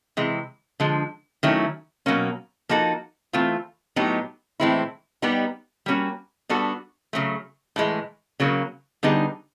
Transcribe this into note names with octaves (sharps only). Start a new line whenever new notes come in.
C3 E3 G#3
D3 F3 G#3
D#3 F#3 A3 C#4 E4
B2 F#3 A#3 C#4
F3 A#3 D#4 F#4 A4
E3 A3 C4 F4
A2 F#3 B3 D#4 G4
A2 E3 G#3 C4 E4
G3 B3 D#4 G4
G3 A#3 C#4 F#4
G3 B3 D4 F#4 A4
C#3 F#3 A3
A2 E3 G#3
C#3 F#3 A#3
D3 G3 B3 D#4 G#4